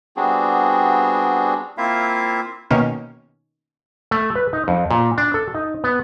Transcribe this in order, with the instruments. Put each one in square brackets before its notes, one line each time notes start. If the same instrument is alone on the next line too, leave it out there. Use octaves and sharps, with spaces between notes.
[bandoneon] G3 B3 C4 D4 F#4 G#4
[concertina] A#3 C4 E4 F4 E5 F5
[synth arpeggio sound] B2 D#3 A#3 C#4
[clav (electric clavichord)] A3
B4
D#4
F2
A#2
D4
A4
D#4
B3